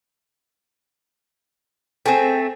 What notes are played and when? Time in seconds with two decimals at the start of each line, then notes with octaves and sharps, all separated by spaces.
2.06 A3 C4 G#4 G5